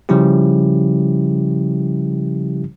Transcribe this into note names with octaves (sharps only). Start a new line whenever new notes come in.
C#3 F3 G3 C#4 E4 G4